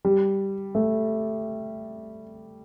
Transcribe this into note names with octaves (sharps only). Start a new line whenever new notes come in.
G3
A3